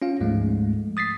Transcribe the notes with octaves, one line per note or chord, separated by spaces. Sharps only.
C#4 F4 F5
D2 G#2 F3 G#3 A3
D#6 A6 B6 C7